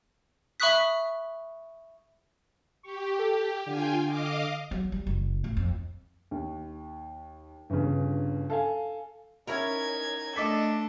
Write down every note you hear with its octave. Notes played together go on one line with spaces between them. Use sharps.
E5 B5 C#6 D#6 F#6 B6
G4 C#6
A4
D3 F4 G5 G#5
D#5 F5 D6
F#3
G3
F#1
A2
F2
D#2
G1 G2 C#3
A4 F5 G#5
C#4 D#4 E4 A#4 G#6
A3 D4 A4 D#5 D6 B6